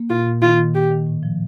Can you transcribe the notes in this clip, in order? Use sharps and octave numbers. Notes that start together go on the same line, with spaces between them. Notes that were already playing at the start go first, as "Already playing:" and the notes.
Already playing: A#3
A#2 F4
A#2
D#3 F4
D#3
D#3 G4
D#3
A2
F3